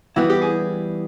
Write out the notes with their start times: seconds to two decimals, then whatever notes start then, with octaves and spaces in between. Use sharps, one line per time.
0.16 E3 G3 B3 E4 F#4
0.30 G4
0.42 G#4